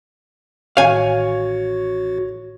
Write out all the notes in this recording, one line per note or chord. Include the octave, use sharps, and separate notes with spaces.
A1 A2 D#3 F#4 C#5 F5 G#5